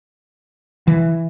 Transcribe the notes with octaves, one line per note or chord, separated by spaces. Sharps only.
E3